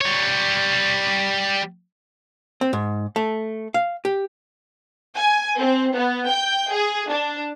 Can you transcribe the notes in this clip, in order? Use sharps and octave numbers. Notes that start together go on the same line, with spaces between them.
G3 C#5
C4
G#2
A3
F5
G4
G#5
C4
B3
G5
G#4
D4